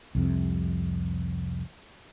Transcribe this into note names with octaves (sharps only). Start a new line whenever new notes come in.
C2 F2 C3